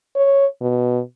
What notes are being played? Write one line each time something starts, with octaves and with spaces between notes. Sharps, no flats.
C#5
B2